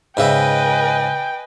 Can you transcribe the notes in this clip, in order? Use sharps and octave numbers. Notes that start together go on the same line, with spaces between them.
G#2 C#3 B4 D#5 E5 G5 G#5